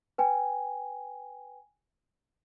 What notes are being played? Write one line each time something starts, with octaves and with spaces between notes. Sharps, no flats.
B4 G5 G#5